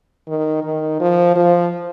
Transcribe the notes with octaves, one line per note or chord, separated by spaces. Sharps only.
D#3
D#3
F3
F3